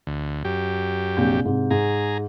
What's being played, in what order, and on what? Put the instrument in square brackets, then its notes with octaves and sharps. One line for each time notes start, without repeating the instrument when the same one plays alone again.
[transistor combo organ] D2
F#2 G4
[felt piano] A#1 C3 G6
G#2 C3
[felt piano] G#2 [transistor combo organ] G#4 A#5